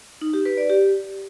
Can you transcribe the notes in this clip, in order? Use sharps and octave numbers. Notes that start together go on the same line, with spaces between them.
D#4
G4
B4
D5
G4